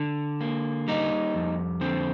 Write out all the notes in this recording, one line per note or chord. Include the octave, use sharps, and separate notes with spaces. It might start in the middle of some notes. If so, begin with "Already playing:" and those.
Already playing: D3
A#3
G3 D#4
F2
D3 C4